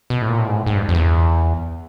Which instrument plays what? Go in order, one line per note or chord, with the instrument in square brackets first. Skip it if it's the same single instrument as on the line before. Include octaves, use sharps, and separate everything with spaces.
[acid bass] B2
A2
A#2
A2
G#2
A2
G#2
G2
F2
E2